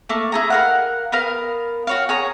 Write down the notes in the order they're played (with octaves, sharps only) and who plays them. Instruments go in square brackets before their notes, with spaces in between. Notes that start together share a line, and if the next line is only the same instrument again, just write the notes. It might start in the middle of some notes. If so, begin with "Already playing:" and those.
[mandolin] A3 A#3
E4 G#4 A#5
A#4 F5 F#5
B3 A#4 F5
F#4 C#5 F5
G#4 C#5 A#5